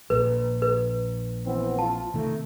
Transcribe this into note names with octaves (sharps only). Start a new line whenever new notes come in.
A#1 A#2 B4
B4
E3 B3 C4
F4 A5
C3 D#3 A3